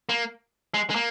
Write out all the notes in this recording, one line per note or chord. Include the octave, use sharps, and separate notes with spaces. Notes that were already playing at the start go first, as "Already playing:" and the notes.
A#3
G#3
G#3
A#3